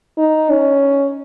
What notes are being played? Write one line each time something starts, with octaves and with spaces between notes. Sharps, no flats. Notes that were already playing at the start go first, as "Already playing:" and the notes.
D#4
C#4